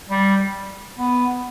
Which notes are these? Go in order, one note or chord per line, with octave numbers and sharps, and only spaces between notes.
G3
B3